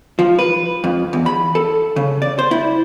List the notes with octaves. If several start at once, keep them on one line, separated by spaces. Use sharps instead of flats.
F3
B4
F2
E2
B5
A4
C#3
D5
C5
E4